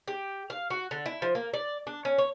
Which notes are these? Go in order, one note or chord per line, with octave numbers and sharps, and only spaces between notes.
G4
F5
F#4
D3
E4
F3
A#3
D5
D4
C#4
C#5